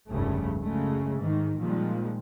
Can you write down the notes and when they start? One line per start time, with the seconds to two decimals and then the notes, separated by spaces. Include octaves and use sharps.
0.10 F1 C#2 G2 C#3 A3
0.62 F#2 C#3 G#3 A3
1.16 G#2 D#3
1.60 A#2 D#3 F3 G3 G#3